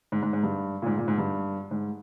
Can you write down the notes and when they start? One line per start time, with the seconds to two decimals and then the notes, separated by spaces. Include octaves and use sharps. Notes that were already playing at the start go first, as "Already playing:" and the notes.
0.12 G#2
0.22 G#2
0.33 G#2
0.43 G2
0.82 A#2
0.86 G#2
0.98 A#2
1.08 G#2
1.18 G2
1.71 G#2